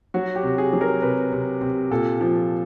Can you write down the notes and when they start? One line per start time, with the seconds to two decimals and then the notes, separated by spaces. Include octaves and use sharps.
0.14 F#3 F#4
0.36 G4
0.43 C3
0.58 G#4
0.73 F#3
0.81 A#4
1.02 C3 B4
1.32 C3
1.61 C3
1.91 A#2 A4
2.21 F3